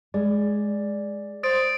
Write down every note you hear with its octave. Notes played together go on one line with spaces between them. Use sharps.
G#3 D5
C5 D#6 A6 D7